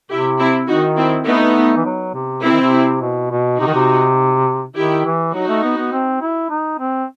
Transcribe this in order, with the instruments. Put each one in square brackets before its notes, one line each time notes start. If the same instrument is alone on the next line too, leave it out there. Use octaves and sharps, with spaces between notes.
[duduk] C3 [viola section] E4 G4
[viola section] C4 E4
[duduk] D#3 [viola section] D#4 F#4
[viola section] C4 E4
[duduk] A3 [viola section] B3 D#4
[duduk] E3
F#3
C3
[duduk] C3 [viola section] C4 E4
[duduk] D#3
C3
B2
B2
[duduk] C3 [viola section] D#4 F#4
[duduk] D#3
C3
[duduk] D#3 [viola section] E4 G4
[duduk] E3
[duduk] F#3 [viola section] D#4 F#4
[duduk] A3
B3
B3
C4
E4
D#4
C4